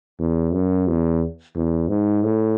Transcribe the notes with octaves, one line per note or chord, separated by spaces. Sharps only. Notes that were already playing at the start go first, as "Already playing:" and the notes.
E2
F#2
E2
E2
G#2
A2